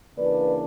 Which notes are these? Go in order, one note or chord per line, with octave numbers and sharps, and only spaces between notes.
C#3 E3 A#3 D4 B4 D5